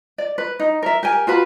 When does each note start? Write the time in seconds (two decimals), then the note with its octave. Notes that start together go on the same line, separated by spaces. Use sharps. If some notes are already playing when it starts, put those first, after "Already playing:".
0.18 D5
0.38 B4
0.59 D#4
0.83 A#4 E5
1.03 G4 A#4 G#5
1.27 F4 F#4 B4 B5